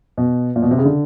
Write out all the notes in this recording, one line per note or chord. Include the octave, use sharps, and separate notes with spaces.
B2
A#2
B2
C3
C#3
D3